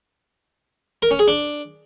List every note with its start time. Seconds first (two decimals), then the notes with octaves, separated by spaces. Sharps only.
1.02 A#4
1.11 C#4
1.19 G#4
1.28 D4